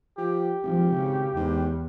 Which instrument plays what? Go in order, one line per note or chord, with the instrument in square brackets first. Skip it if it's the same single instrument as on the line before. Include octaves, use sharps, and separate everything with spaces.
[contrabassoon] F3 [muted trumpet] G4
[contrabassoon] G#1 [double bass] F3
[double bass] C#3
[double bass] E2 [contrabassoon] G#2